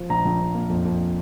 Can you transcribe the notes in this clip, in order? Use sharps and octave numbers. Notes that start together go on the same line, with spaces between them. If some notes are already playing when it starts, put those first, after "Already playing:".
Already playing: F3
A#1 A#5
A#1
A#1
A#3
F2
F2